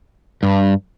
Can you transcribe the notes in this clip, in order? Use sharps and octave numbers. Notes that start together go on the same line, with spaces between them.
G2